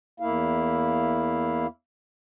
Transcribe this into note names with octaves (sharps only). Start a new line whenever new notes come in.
E2 A#3 E4 F5